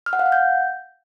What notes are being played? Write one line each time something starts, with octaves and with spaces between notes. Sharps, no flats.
F6
F#5
F5
F#5
G6